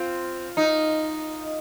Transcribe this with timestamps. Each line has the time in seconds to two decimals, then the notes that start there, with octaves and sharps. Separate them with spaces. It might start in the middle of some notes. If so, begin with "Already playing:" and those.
Already playing: C4 F4
0.57 D#4